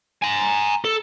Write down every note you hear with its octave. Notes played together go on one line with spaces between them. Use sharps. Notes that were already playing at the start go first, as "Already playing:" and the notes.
G#5 A#5
A4